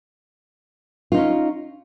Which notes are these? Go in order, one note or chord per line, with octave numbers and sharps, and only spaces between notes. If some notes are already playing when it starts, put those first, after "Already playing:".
C#4 D#4 F4